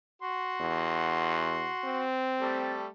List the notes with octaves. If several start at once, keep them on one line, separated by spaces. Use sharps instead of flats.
F#4 C6
E2
C4
G3 A3 A4